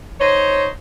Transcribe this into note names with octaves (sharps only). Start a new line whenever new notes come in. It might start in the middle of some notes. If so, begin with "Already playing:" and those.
D#4 C5 C#5